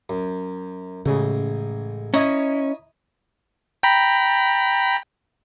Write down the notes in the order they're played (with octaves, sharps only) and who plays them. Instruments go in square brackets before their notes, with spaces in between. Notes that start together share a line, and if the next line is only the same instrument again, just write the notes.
[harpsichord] F#2
[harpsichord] A1 G#3 [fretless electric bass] C#3
[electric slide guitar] C#4 [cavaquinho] E4 D#5 A#5 [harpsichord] C#5 C#6 D#6
[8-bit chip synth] G5 A#5 B5